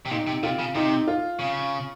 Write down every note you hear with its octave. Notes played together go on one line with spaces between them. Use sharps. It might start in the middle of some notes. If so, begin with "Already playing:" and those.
C3
A#2 D#4
C3
C3 F4
C#3
C3 D#4
F4
C#3